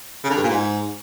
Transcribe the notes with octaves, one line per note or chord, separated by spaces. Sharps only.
C#3
D3
G2
A#2
G#2